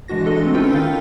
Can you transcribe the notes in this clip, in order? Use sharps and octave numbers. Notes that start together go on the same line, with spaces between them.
E3 G#3 D4 F#4 A#6
G#3 D4 A4 D#5
G#3 A3 C4
C#4 D#4 F4 A4 B4 G5
D#3 F5